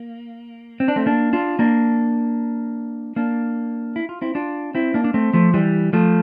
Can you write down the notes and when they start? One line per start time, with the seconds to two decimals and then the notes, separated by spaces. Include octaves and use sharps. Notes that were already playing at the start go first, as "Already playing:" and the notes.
Already playing: A#3
0.80 C4
0.88 D4
0.96 A3 C4
1.06 A#3 D4
1.33 D4 F4
1.59 A#3 D4
3.16 A#3 D4
3.96 E4
4.09 F4
4.22 C4 E4
4.35 D4 F4
4.75 C4 E4
4.94 A#3 D4
5.04 D4
5.14 A3 C4
5.33 F3 A3
5.54 E3 G3
5.93 F3 A3